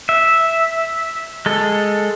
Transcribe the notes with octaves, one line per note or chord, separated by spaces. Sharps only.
E5
G#3 A4